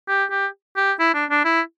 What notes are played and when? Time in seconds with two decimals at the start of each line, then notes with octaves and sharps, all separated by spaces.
0.08 G4
0.31 G4
0.76 G4
0.99 E4
1.14 D4
1.30 D4
1.45 E4